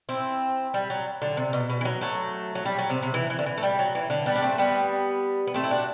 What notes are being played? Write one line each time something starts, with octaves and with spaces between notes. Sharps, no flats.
C4 E4
G3
F#3
D3
C3
B2
B2
E3
F#3
F#3 A3
F#3
G3
F#3
C3
C3
E3
E3
D3
E3
A3
G3
F#3
E3
D3
G3 B3
D4
A3 C4
G3 B3
B3
A3 C4
E4
D4 F#4